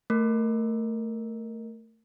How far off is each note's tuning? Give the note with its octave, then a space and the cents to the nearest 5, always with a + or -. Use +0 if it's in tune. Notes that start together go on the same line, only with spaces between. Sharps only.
A3 +20 A#4 +0